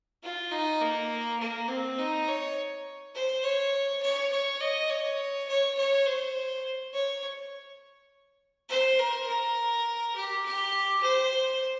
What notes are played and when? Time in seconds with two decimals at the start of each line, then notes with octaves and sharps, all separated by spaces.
0.23 F4
0.51 D#4
0.81 A#3
1.40 A#3
1.68 C4
1.98 D#4
2.28 C#5
3.15 C5
3.44 C#5
4.02 C#5
4.32 C#5
4.61 D#5
4.90 C#5
5.48 C#5
5.77 C#5
6.06 C5
6.94 C#5
8.69 C5
8.99 A#4
9.27 A#4
10.16 G4
10.45 G4
11.03 C5